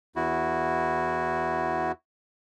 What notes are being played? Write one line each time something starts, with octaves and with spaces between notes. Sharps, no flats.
E2 E4 F#4